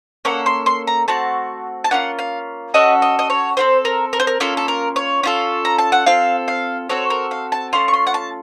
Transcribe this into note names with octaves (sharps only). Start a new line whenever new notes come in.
A#3 C#4 A4 F#5
C6
C6
A#5
A3 C4 F#4 A5
A5
A#3 C#4 F4 F#5
F5
C#4 F#4 A4 D#5
D#5
D#5
C#5
C4 F4 A4 C5
A#4
A#4
C5
A#4
A#3 C#4 F4 A4
A4
A#4
C#5
C#4 F4 A4
A#5
A5
F#5
C4 F4 A4 F5
F5
C4 F#4 A4 C#5
A#4
F5
A5
A3 C#4 F4 C6
C#6
C6
F#5
A5